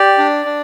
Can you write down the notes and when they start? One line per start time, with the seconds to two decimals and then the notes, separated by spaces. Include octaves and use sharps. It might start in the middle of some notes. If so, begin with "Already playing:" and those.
Already playing: G4 D5
0.18 D4
0.45 D4